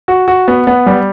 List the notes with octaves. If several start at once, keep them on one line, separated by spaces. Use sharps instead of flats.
F#4
F#4
B3
B3
G3